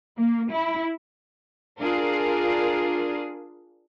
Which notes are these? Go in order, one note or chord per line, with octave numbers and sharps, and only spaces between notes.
A#3
E4
D4 F4 G#4 A#4